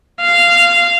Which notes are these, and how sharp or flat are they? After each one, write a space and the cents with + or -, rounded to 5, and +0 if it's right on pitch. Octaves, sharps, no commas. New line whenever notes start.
F5 -10